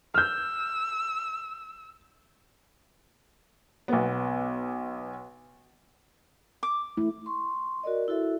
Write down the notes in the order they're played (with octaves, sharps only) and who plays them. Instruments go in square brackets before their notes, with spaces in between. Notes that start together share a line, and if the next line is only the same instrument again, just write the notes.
[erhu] E6 [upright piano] F6 G6
[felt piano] B1 B3
[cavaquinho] D6
[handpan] A3 E4
[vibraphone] C6 C#6
F#4 A#4 D5 D#5
E4 F#4 A4 E5